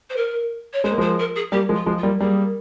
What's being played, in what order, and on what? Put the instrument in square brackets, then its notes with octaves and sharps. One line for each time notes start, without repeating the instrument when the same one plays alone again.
[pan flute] C5
A#4
C#5
[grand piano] G#3 [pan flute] C5
[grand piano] A#3
[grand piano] F3 G#3 [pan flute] C5
[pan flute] A#4
G#4
[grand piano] G3 A#3 [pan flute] G4
[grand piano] F3 G#3
[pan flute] F4
[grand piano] F3 G#3
[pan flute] F4
[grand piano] G3 A#3
[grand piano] G3 A#3 [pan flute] G#4